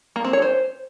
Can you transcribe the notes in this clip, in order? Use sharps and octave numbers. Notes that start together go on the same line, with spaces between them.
A#3
C4
C#5
C5